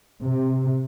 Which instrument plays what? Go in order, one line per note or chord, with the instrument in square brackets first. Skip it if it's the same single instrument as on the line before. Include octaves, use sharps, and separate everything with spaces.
[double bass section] C3